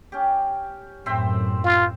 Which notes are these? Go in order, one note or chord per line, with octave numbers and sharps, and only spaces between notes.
C#4 G4
F#2 A2 C4 C5 E5
F4